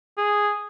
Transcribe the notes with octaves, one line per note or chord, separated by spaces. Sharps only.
G#4